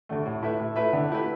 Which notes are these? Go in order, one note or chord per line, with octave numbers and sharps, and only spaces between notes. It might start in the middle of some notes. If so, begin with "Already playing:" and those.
D2 D3 A3
A2
A3 E4 B4 E5
A2
A3 E4 B4 E5
D3
A3 E4 G4 B4